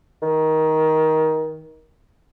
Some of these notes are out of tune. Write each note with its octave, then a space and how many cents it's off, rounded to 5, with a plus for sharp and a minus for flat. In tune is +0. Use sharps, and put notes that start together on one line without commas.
D#3 +15